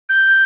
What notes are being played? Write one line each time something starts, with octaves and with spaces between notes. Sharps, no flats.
G6